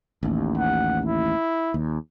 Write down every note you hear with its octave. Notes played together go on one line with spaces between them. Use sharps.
A1 D#2
F#5
E4
D#2